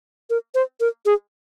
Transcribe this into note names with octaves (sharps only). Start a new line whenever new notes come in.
A#4
C5
A#4
G#4